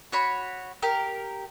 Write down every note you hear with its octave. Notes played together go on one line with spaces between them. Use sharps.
F#4 C#5 B5
G4 A#4